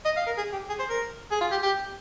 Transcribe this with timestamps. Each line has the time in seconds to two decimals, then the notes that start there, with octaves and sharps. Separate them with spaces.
0.05 D#5
0.17 F5
0.26 A#4
0.37 G#4
0.53 G4
0.69 G#4
0.79 C5
0.90 A#4
1.31 G#4
1.41 F4
1.51 G4
1.62 G4